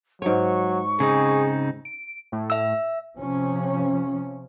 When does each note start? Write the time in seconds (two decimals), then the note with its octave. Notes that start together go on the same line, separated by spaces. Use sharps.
0.22 G#2 F#3 C#5 C#6
1.00 C#3 C4 D#4 G#4
1.85 D7
2.32 A2
2.50 E5 E6
3.17 C3 F3 C#4